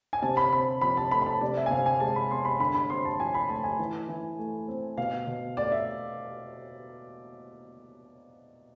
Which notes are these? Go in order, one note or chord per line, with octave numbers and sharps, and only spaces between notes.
G#5
C3 A5
B5
C4 B5
F3 B5
A5
A3 B5
B5
A5
C3 D5
E5
G#5
C3 F5
G#5
G#3 A5
B5
B3 C6
B5
D3 B5
B5
C4 C6
A5
F3 G#5
B5
A3 A5
G#5
E3
E3
A3
C4
B2 F5
B2
A3 D5
E5